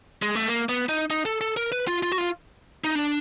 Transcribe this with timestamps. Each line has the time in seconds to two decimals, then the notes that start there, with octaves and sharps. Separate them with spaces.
0.22 G#3
0.35 A3
0.48 A#3
0.69 B3
0.89 D#4
1.10 D#4
1.25 A4
1.41 A4
1.57 A#4
1.72 B4
1.87 F4
2.03 F4
2.12 F#4
2.18 F4
2.84 D#4
2.95 D4